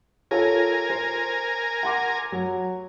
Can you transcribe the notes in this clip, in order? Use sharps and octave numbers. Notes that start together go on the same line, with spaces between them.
F4 A4 A#4 C#5 G#5
C5
F#5 C6 D6
F#3